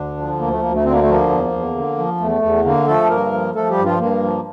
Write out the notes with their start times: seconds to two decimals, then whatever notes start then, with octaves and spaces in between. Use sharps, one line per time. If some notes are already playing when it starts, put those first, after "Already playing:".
Already playing: D2 D3 D4
0.17 F3
0.39 D2 A#3
0.50 A3
0.62 D2 A#3
0.74 A3
0.84 D3 C4
0.92 A#3
1.02 A3
1.08 F3 A#3
1.30 E2
1.52 E2
1.75 D3
1.98 F3
2.20 E2 A3
2.42 E2
2.65 D3 A#3
2.87 F3 A3 A4
3.09 G2 A#3 A#4
3.32 F3
3.55 F3 A3 A4
3.69 G3 G4
3.78 G2
3.85 F3 F4
4.00 G2 A#3
4.23 F3